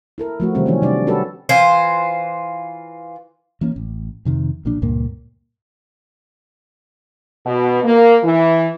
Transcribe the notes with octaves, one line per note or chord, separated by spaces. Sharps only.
E4 A4 A#4
F3 A3 F#4
C3 D#3 E3 G3 C4 C#4
D#3 F3 F#3 C#4
C3 G3 D4 D5
G3 C#4 F#4 G4 A4 B4
E3 F4 C5
E3 A#3 C#4
A1
F2 C3 D#3
B1 A#2 F3 D4
C#2 G2 A#2 A#3
B2
A#3
E3